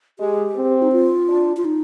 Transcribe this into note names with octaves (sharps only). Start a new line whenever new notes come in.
G#3 G4
C4
D#4
F4
D4
F4
D#4